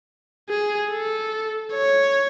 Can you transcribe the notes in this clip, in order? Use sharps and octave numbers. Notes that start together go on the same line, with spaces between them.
G#4
A4
C#5